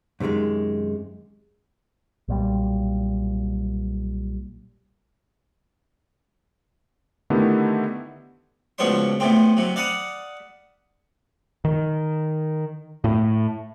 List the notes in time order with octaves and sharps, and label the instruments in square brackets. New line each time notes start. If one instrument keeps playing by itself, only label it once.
[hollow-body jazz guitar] F#2 C3 D#3 G3 G#3
[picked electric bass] B1 A#2 G3
[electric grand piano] D3 D#3 A3 B3 E4 G4
[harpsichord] C#2 B2 F3 C#4 D4 C6
E2 A2 C3 C4
C3 F#3
D5 F5 F#5 A5 B5 D#6
[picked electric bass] D#3
A2